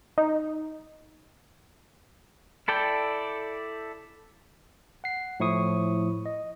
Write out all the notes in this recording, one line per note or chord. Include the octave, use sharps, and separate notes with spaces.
D#4
E4 A4 D5 G5
F#5 C7
A2 F3 E4 C#6 D#6
D#5